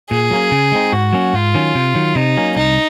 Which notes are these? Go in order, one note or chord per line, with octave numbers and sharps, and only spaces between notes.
A#2 G#4
F#3 A#3 C#4
C#3
G#3 C4 D#4
G#2 F#4
F#3 A#3 C#4
G#2 F4
D#3 F#3 C#4
C3
D#3 F#3
C3 D#4
F#3 A#3 C#4
C2 D#4